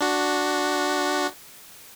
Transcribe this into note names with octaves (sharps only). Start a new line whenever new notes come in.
D4 F#4